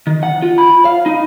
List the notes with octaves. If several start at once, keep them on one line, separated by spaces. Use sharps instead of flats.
D#3
F#5
F4
B5
F5
D#4